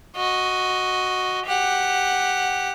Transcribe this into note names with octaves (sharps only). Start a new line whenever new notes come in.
F#4 D#5
G4 F#5